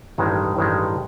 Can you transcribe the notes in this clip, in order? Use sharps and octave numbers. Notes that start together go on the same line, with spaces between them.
A1 G2 D#3 G#3
A1 G2 D#3 G#3